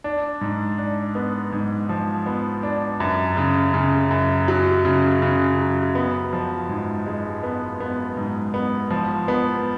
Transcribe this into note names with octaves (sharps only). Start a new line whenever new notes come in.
D4
G#2
D4
B3
G#2
F3
B3
D4
F#2
C#3
C#3
F#2
F#3
C#3
C#3
F#3
B3
F3
G#2
G#3
B3
B3
G#2
B3
F3
B3